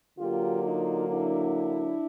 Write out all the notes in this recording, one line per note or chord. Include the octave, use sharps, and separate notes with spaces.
D3 F#3 A#3 F4 G4
D#4 F4
D4 E4